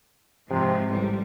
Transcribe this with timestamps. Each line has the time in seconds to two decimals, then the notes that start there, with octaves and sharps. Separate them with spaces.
0.50 G#2 C3 F3
0.91 A1 G3